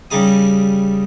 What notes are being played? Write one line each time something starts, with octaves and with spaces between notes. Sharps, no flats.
C#3 G3 D#4 D6 D#6